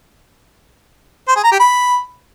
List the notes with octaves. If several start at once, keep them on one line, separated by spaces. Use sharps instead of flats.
C5
G#4
A#5
G4
B5